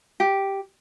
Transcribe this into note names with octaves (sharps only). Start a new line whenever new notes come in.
G4